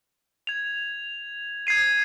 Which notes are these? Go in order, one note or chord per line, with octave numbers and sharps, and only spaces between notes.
G#6 F7
G#6 C7 D#7